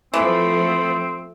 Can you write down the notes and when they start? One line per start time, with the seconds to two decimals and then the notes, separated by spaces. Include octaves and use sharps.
0.14 E3 F3 A3 C4